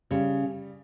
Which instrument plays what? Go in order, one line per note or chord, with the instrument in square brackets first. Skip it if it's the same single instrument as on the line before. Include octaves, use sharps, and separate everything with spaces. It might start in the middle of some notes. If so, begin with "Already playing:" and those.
[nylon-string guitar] C#3 [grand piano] G3